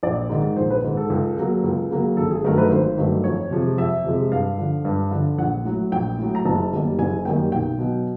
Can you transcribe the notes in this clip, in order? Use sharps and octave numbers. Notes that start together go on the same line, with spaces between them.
A#1 D5
G#2 D#3
A#1 C5
B4
G#2 D#3
A4
C#2
C#3 F#3 A#3
C#2
C#3 F#3 A#3
G#1 A4
G#4
G2 D#3 F#3 A3 A#4
B4
G#1 C5
G2 D#3 F#3 A3
F2 C#5
C3 F3 G#3
F2 E5
C3 F3 G#3
G2 F5
D3 F3
G2
D3 F3
A#1 F#5
A2 F#3
A#1 G5
A2 F#3
A#5
F#1 A5
F#2 D#3 G3 A#3
F#1 G#5
F#2 D#3 G3 A#3 G5
B1 G5
B2 F#3